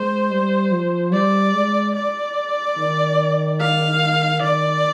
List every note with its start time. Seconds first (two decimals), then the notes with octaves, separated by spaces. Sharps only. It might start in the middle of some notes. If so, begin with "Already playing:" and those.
Already playing: G#3 C5
0.31 G3
0.72 F3
1.13 G3 D5
1.54 G#3
1.96 D5
2.77 D#3
3.60 F5
4.42 D#3 D5